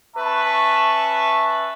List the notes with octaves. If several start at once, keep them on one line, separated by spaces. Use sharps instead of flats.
C#4 B4 E5 A5 C#6